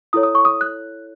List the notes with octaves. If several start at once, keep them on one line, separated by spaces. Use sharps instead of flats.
E4 A4 C#5 D#6
D#6
C#6
D#6
F#6